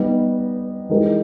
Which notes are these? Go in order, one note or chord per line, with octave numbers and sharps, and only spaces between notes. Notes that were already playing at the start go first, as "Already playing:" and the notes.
Already playing: G3 B3 D#4
E3 G#3 D#4 G4 A#4